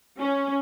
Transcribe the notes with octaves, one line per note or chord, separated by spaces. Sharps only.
C#4